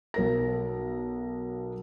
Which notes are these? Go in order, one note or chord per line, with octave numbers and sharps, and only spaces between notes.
B1 A#4 A#6